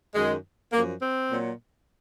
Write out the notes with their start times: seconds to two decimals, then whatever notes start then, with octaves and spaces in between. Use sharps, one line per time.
0.15 F#2 D#3 F#3 G#3
0.72 F#2 F3 A#3
1.02 C4
1.30 A#2 F#3